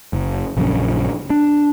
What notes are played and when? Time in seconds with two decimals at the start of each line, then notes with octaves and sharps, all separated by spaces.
0.13 F#1
0.57 A#1 F#2 C#3 F3
1.30 D4